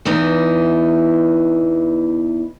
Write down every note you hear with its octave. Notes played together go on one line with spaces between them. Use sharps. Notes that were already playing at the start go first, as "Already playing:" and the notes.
E2 E3 B3 D#4 E4